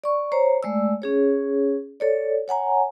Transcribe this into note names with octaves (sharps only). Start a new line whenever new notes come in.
D5 C#6
C5 C#5 A#5
G#3 A3 D5 E6
C#4 G#4 C#5
A4 C#5 D5
C#5 F#5 G#5 A#5